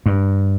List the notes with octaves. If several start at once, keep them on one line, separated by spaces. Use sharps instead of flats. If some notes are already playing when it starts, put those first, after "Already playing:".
G2